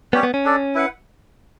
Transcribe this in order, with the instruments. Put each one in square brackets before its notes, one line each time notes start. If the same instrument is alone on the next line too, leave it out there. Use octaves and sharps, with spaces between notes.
[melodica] G3 C#4 G4 C#5 [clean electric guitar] B3
[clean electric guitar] B3
C#4
[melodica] D4 A4 D5
E4 B4 F#5